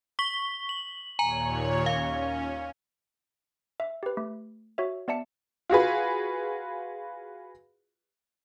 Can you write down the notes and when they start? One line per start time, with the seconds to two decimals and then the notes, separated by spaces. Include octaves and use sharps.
0.19 C#6 B6 G7
0.69 F#7
1.19 D#2 A#2 C#5 G#5 A#5 F#7
1.86 C#4 F5
3.80 E5
4.03 G4 B4
4.17 A3
4.78 F#4 C#5 E5
5.08 B3 D5 E5 A5 C#7
5.70 F4 F#4 G#4 B4